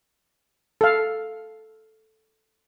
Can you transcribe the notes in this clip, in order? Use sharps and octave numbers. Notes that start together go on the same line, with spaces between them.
A4 F5